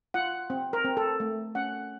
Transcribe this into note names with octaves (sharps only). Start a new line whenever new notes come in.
F4 F#5
C4
A#4
C4
A4
A3
C#4 F#5